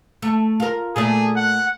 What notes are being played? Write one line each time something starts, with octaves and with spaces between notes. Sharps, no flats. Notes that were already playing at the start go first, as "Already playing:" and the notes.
A3
F4 A#4
A#2 A3 G#4 D5
F#5